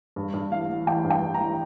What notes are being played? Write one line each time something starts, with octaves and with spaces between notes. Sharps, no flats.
G2
G2
A1 F5
A1
A1 G5
G2
G5
G2
A#5
A1